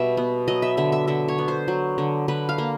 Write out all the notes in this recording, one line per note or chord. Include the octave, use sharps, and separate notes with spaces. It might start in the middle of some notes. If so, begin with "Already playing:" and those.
Already playing: B2 G3 E5
B3
F#3 D#5
E5
D3 E5
E5
D3 E5
C#5
B3
C5
F#3
D3
D3 B4
F5
A#3